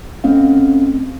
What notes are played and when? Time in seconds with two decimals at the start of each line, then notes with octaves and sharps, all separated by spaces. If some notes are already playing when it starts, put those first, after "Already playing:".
0.24 A3 C4 C#4 F5